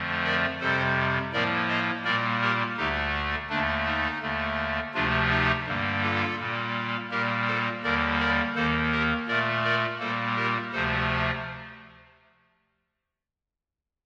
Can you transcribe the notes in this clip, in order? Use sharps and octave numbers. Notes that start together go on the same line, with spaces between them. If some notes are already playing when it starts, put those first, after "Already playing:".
Already playing: F2 D3 F3 A3
A#4 D5
F2 C3 G3 A4 C5
A2 F3 A#3 A#4 D5
C5 D#5
A#2 G3 A#3 A#4 D5
G4 A#4
D2 D3 A3 D#4 G4
D#2 D3 A3 D4
D#4
D#2 D3 A3
D2 C3 F3 A3 D4 F4
D#4 G4
G2 D3 G3 A#3
F4 A4
A#2 G3 A#3
A#2 G3 A#3 G4 A#4
A4 C5
D#2 D3 G3 A#3 A#4 D5
A#4 D5
D#2 D#3 A#3 A4 C5
G4 A#4
A#2 A3 A#4 D5
A#4 D5
A#2 G3 A#3 A4 C5
G4 A#4
D2 C3 F3 A3 A4 C5